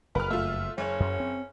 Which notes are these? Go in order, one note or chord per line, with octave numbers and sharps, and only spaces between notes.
F#1 F2 A#4 B4 F6
A3 F4 E5
F#1 C#4 C#5
F#2
C4